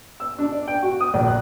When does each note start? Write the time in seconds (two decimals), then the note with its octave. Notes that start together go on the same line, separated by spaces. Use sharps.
0.20 E6
0.38 D4
0.52 D5
0.67 G5
0.82 F#4
1.00 D#6
1.14 A#1
1.27 F#6